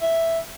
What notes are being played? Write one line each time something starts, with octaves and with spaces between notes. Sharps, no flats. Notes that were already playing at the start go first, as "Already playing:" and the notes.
E5